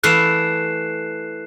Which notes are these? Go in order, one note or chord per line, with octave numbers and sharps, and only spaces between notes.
E3 A3 F5 F#6 C7 E7